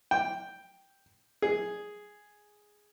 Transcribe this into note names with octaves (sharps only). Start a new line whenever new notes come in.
G5
G#4